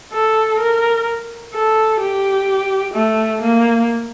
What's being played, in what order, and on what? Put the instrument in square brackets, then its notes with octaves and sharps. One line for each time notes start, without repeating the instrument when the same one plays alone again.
[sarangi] A4
A#4
A4
G4
A3
A#3